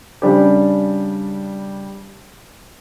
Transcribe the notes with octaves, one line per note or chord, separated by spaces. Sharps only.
C#3 G3 D4 G4